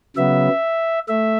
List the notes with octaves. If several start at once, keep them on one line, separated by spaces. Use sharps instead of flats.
C#3 F#3 B3 E5
A3 E5